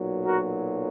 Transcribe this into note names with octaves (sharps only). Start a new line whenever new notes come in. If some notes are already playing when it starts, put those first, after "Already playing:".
Already playing: B1 A#2 F#3
F#4 A#4